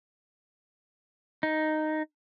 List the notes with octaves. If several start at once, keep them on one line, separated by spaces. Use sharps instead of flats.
D#4